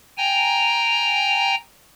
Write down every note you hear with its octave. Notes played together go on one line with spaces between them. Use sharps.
G5 G#5 A#5